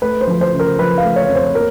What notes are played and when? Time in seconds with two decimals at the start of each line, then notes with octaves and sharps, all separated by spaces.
0.02 A3 B4
0.21 C5
0.27 F3
0.41 C5
0.53 C#3
0.60 A#4
0.79 F3 B4
0.98 F5
1.04 A3
1.16 C#5
1.29 F2
1.35 C5
1.55 A#3 A#4